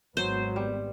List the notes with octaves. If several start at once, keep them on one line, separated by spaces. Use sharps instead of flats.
G#1 F#3 B3 C5
G3